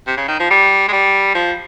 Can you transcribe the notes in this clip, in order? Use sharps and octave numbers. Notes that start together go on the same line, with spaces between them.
C3
C#3
D#3
F3
G3
G#3
G3
F3